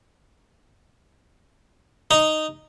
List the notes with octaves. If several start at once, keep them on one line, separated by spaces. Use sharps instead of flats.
D#4